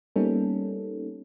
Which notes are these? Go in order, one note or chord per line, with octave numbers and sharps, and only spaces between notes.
G3 A#3 B3 C#4 D#4 A4